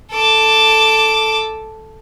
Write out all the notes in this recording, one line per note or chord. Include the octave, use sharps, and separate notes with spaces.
A4 D6